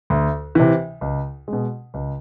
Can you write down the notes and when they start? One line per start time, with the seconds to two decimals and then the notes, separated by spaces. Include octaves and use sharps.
0.10 D2
0.55 C3 E3
1.01 C#2
1.48 B2 G#3
1.94 C#2